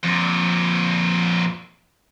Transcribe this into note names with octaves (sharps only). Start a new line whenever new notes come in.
F2 A#2